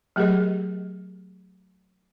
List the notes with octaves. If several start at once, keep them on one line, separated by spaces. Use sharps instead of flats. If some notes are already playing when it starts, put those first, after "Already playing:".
F#3 A3 G4 G#4 A#4 D#5